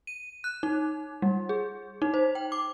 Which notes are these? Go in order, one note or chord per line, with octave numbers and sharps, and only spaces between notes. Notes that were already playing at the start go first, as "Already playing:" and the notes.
D#7
F#6
D#4
G3
G#4
D#4
C5
G5
D6